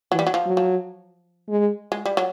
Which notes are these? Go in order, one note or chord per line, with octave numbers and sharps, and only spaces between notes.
E3 F#3
G3
F#3
F3
F#3
F3
G#3
G#3
G3
F#3